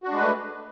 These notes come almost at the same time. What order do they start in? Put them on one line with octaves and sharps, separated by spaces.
F#4 D4 G#3 B4 A3